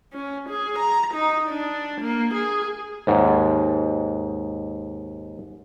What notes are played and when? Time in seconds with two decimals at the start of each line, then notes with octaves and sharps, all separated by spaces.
0.13 C#4
0.49 G#4
0.79 A#5
1.14 D#4
1.49 D4
2.01 A#3
2.34 G#4
3.07 D#2 G#2